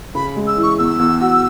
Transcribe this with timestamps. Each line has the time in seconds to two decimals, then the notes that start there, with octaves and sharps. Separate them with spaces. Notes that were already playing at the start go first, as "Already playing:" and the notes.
0.15 C#3 B5
0.36 G#3
0.47 E6
0.57 E3
0.63 C#6
0.79 E2 E6
0.99 E2
1.21 F#4